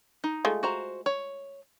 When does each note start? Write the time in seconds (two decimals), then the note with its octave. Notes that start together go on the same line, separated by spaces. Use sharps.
0.24 D#4
0.45 G#3 A3 F4
0.63 F#4 C5 A#5
1.06 C#5